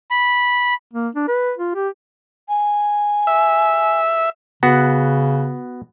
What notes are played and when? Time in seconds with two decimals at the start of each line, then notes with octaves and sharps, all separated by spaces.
0.11 B5
0.93 A#3
1.15 D4
1.28 B4
1.58 F4
1.75 G4
2.49 G#5
3.27 E5
4.63 C#3 B3 F#4